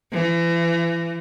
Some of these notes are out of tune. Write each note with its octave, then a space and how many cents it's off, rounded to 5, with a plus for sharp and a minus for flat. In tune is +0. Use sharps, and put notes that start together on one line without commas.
E3 +35